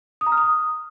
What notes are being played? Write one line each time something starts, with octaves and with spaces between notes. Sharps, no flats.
D#6
A#5
F6
D#6